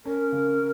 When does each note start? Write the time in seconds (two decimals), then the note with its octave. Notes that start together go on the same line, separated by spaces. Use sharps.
0.05 C#4 A#4
0.32 C#3